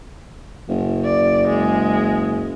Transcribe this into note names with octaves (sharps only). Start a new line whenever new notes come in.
F#1
D5
G#3